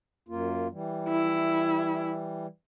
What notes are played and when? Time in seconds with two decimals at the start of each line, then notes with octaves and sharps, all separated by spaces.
0.28 F#2 A#3 F4
0.72 E3 G3
1.09 E4